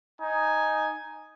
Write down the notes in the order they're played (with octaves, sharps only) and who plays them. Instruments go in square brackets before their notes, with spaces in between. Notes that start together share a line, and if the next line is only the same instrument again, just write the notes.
[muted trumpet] D#4 [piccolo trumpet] G#5